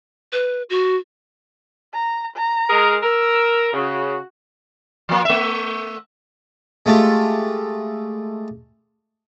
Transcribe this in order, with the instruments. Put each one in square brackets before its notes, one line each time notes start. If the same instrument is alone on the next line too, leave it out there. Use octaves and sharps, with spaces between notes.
[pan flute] B4
F#4
[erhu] A#5
A#5
[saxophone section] G#3 G#4 A#4
[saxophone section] A#4 [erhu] E6
[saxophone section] C#3 [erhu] F#4
[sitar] F3 A#3
A3 E5
[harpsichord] G#3 A3 F4 G4 A4